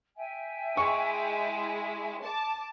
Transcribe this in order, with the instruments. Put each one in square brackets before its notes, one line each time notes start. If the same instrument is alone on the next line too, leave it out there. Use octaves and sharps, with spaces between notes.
[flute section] E5 G5 G#5
[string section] G#3 E4 [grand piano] C#6
[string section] A5 D6